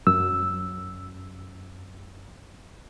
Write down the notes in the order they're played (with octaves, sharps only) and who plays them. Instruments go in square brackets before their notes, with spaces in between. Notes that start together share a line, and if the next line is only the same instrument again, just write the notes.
[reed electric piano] F#2 E6